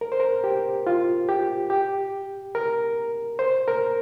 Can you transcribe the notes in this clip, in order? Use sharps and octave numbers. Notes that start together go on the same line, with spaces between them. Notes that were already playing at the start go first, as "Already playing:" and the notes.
A#4
C5
A#4
G4
F4
G4
G4
A#4
C5
A#4